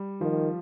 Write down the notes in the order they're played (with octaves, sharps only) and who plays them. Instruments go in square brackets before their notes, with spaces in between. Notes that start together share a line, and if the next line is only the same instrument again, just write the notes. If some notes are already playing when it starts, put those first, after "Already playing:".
Already playing: [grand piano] G3
[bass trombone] D#3 [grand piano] F3